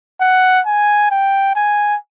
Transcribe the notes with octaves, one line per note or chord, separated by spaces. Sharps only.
F#5
G#5
G5
G#5